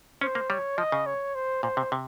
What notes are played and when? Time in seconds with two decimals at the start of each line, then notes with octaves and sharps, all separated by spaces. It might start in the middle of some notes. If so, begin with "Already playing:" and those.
0.21 C#4 C5
0.35 A#3
0.50 G3 C#5
0.78 F3 D#5
0.92 C#3
1.06 C#5
1.35 C5
1.63 A#2 C5
1.77 C3
1.92 C3